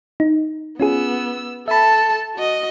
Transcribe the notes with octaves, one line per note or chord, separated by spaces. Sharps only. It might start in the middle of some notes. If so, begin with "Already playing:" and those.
D#4
B3 C#4 F4 G#4 E6
A4 E5 A5 B5
F#4 D#5